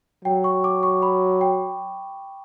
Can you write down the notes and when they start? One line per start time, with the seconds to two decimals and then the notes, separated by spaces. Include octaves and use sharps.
0.25 F#3 G5
0.44 C#6
0.64 D6
0.83 C#6
1.02 B5
1.41 G5